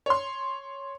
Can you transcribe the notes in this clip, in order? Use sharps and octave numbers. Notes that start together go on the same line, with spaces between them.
C#5 C6